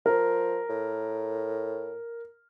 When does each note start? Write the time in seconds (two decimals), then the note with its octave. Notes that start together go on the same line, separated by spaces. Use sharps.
0.06 F3 A#4
0.70 A2